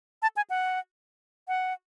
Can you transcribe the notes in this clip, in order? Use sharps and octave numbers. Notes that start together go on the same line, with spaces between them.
A5
G#5
F#5
F#5